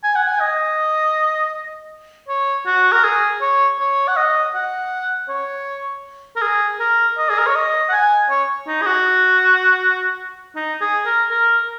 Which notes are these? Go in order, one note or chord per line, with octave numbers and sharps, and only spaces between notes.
G#5
F#5
G#5
D#5
C#5
F#4
A#4
G#4
C#5
C#5
F#5
D#5
F#5
C#5
A#4
G#4
A#4
D#5
G#4
A#4
C#5
D#5
F#5
G#5
C#5
D#4
G#4
F#4
D#4
G#4
A#4
A#4